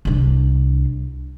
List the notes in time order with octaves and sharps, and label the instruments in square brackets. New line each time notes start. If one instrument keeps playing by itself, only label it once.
[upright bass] C2 D4